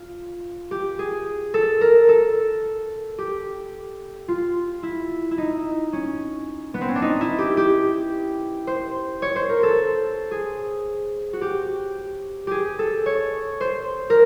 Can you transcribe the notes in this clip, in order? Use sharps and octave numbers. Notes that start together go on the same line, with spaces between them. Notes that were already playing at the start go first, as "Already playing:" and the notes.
Already playing: F4
G4
G#4
A4
A#4
A4
G4
F4
E4
E4
D#4
C#4
B3
C4
C#4
D4
D#4
E4
G4
G4
C5
C#5
C5
A#4
A4
G#4
F#4
G4
G4 G#4
A4
C#5
C5
A#4